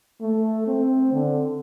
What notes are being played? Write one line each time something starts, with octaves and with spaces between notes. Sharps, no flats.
A3
C4
D3